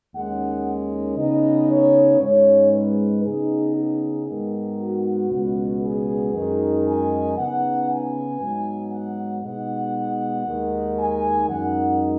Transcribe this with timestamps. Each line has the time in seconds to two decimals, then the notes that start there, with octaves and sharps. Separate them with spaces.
0.14 D#2 D#3 G#3 C#4 F#5
1.17 C#3 B3 D#4 D#5
1.70 C#5
2.20 G#2 G#3 C#4 C#5
2.72 B4
3.23 C#3 B3 D#4 G#4
3.76 G#4
4.27 G#2 D#3 B3 D#4
4.79 F#4
5.30 C#2 B2 B3
5.82 G#4
6.33 F#2 D#3 G#3 D#4
6.86 G#5
7.37 C#3 B3 D#4 F#5
7.89 G#5
8.40 G#2 F#3 B3 D#4
8.92 F#5
9.43 B2 G#3 B3 D#4 F#5
10.46 D#2 D#3 G#3
10.98 G#5
11.49 F#2 D#3 G#3 D#4 F#5